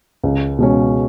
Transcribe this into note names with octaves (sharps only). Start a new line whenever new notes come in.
C#2
B2 G#3 C#4